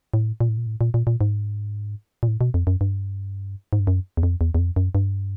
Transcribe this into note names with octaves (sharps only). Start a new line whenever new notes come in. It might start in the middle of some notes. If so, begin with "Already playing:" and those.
A2
A#2
A2
A#2
A2
A#2
A#2
A#2
G#2
A#2
A2
B2
F2
F#2
G2
G#2
G2
F#2
E2
F2
E2
E2
F2
F#2
G2